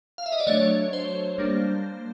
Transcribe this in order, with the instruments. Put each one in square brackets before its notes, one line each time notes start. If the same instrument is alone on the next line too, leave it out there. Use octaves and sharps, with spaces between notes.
[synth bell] F5
E5
D#5
D5
F#3 A3 D4 C#5
C5
G3 A#3 D4